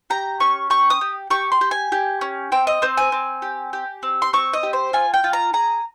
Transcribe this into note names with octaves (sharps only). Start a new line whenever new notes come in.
G4 A#5
C#4 C#6
G4 C#6
D#6
G4
G4 C#6
C6
G4
G#5
G4
C#4
C4 G5
D#5
C4 C5
G#5
C4
G4
G4
C4
C6
C4 C#6
D#5
G4
C5
F4 G#5
G5
F4
A#5
G#4 A#5